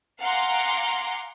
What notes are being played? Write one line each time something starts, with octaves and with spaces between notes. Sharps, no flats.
F5 F#5 G#5 A#5 C6 D6